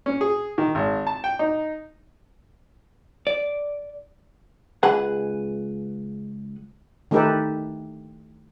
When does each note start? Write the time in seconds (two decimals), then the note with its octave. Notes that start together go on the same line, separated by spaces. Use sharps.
0.06 C#4
0.21 G#4
0.58 D#3
0.75 G#1
1.07 A5
1.24 G5
1.39 D#4
3.27 D5
4.83 C#2 G#4 B4 F#5
7.11 D#3 A3 D#4 G4 A4 B4